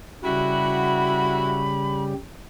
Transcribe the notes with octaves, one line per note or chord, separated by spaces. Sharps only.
C#3 G3 E4 F#4 G4 B5